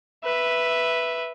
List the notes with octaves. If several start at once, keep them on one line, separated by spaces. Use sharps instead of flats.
B4 E5